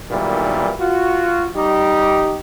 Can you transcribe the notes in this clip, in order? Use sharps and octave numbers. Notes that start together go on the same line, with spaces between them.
B1 A#2 D#3 E3 G3
F4 F#4
G3 D#4 G4